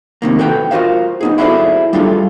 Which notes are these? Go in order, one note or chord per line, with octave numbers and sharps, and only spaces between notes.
A2 C3 D#3 A#3
E2 F#4 A4 B4 G5
F4 F#4 A#4 C5 F5
B3 D#4 G#4
E4 F#4 G#4 A4 C5 D5
G3 D4 F4 G#4 A4